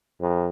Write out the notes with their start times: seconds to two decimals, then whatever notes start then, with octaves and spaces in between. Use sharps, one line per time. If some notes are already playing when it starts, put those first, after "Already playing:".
0.21 F2